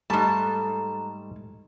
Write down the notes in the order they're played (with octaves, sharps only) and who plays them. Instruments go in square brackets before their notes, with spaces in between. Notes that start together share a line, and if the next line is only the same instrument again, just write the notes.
[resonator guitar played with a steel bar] G#2 A5 [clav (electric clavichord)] G3 A3 [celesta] A4 A#5 E7